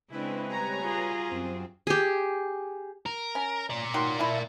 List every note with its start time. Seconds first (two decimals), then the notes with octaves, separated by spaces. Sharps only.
0.12 C#3 G#3 C4 D4 E4 B4
0.49 G3 B4 C#5 G#5 A#5
0.81 F4 F#4 G#4
1.30 F#2 C4
1.87 G4 G#4
3.06 A#4
3.35 C#4
3.70 A#4 D5
3.94 D#3 F#3 C6
4.19 A3 E4